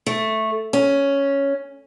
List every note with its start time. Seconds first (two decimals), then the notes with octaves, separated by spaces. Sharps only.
0.06 A3
0.73 C#4